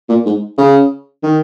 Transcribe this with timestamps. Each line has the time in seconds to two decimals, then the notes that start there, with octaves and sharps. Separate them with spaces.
0.09 A#2
0.25 G#2
0.58 C#3
1.23 D#3